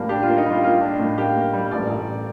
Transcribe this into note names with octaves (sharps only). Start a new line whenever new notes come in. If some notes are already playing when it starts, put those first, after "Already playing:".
Already playing: A2 G3 A#3
D4 G4
A#3 F4
D#4
G3 F4
A#3 F4
D4
A2
A#3 G4
A#3
G3
A1 D5
A1